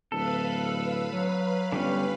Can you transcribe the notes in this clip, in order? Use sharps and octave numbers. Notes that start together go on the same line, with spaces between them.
D1 A4 B4 F5 B5
F#3
G1 D3 G3 C#4